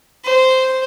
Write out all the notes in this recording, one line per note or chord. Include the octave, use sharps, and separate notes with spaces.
C5